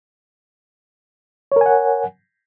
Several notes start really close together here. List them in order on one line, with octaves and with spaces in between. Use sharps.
C#5 A#4 G#5 F#5